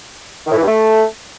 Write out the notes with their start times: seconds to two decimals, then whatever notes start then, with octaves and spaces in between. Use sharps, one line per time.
0.46 D#3
0.51 A2
0.57 E3
0.62 G2
0.67 A3